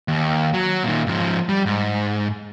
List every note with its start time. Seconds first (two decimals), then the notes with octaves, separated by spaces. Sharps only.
0.08 D#2
0.54 F#3
0.85 A#2 D#3
1.07 G#2 F3
1.49 G3
1.66 G#2